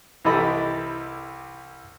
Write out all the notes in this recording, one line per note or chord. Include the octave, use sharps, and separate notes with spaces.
C2 E3 G4 A4 D#5 B5